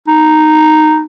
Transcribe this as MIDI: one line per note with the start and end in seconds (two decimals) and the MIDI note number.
0.07 1.02 63